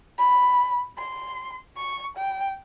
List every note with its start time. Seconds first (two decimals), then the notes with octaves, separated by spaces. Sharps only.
0.18 B5
0.98 C6
1.77 C#6
2.17 G5